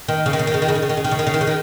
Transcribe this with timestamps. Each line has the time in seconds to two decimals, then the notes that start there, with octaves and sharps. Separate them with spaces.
0.08 D#3
0.26 C#3
0.33 D#3
0.39 C#3
0.47 D#3
0.54 C#3
0.62 D#3
0.68 C#3
0.75 D#3
0.82 C#3
0.89 D#3
0.97 C#3
1.04 D#3
1.11 C#3
1.19 D#3
1.27 C#3
1.34 D#3
1.41 C#3
1.47 D#3